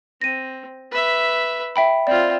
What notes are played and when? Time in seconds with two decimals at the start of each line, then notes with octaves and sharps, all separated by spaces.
0.21 C4 A#6 D#7
0.91 B4 E5
1.76 E5 G5 B5
2.07 C4 F4 D5